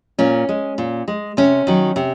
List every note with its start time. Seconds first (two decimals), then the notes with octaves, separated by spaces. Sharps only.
0.18 A#2 C#4
0.49 G#3
0.78 A#2
1.08 G#3
1.37 C3 C#4
1.67 D#3 F#3
1.96 C3